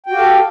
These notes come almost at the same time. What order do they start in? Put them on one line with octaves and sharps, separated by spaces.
G5 F#4 G4 F5 A4